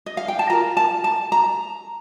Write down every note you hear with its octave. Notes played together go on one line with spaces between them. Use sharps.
D#5
F5
G5
A5
F4 A#4 A#5
A5
A5
A#5